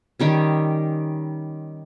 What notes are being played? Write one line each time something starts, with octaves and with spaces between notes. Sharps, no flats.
D#3 G3 C#4